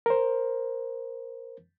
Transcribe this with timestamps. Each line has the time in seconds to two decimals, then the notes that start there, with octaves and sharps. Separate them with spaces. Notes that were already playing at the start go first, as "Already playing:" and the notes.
0.06 A#4 C5